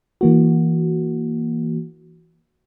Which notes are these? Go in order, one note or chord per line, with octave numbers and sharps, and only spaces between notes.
E3 A#3 F#4